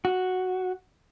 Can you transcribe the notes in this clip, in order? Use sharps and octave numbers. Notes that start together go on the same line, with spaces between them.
F#4